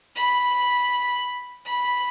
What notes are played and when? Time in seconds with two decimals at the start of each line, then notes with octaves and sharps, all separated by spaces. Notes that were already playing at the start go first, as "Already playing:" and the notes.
0.16 B5
1.66 B5